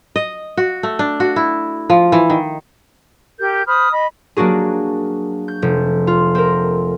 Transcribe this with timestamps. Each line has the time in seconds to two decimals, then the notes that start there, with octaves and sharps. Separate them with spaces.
0.16 D#5
0.57 F#4
0.83 A3
0.99 D4
1.20 F#4
1.36 E4
1.90 F3
2.12 E3
2.30 D#3
3.39 G4 A#4 G6
3.67 C5 B5 D#6 F6
3.91 D#5 B5
4.37 F#3 A#3 D4 F#4 G#4
5.48 G6
5.62 F1
6.07 F4
6.35 C4 A#4